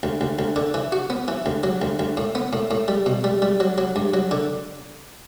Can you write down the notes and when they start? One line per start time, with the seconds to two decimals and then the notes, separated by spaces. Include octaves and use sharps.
0.03 D2
0.21 D2
0.39 D2
0.56 D3
0.74 E3
0.92 F#4
1.10 B3
1.28 E3
1.46 D2
1.63 F#3
1.82 D2
1.99 D2
2.17 A2
2.35 B3
2.53 A2
2.71 A2
2.88 G3
3.06 B2
3.24 G3
3.42 G3
3.60 F#3
3.78 F#3
3.96 G2
4.14 F#3
4.31 D3